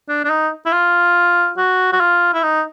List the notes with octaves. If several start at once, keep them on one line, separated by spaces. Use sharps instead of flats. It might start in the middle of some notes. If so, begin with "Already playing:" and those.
D4
D4
D#4
E4
F4
F#4
F#4
F4
E4
D#4